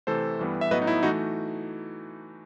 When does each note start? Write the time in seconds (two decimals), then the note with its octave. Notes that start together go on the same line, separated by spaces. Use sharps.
0.07 C3 E3 A3 A4 C5
0.39 G2 E3 G3 B3
0.61 E5
0.71 A2 F#3 B3 B4 D#5
0.82 D#4
0.87 E4
1.03 E3 A3 D#4 F#4